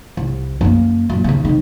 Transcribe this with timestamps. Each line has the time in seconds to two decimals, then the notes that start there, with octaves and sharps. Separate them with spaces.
0.17 C2
0.61 F#2 A#3
1.10 F#2 A#2
1.24 D#2 C#3
1.45 C3 D#3